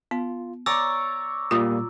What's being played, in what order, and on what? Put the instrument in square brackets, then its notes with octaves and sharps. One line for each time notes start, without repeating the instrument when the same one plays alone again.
[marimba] B3 [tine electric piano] F4
[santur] C#5 D5 A#5 [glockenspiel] E6 [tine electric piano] A6
[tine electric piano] A#2 G3 A#3 [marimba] F4 D#6